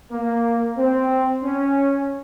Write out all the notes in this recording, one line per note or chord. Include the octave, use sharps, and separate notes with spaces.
A#3
C4
C#4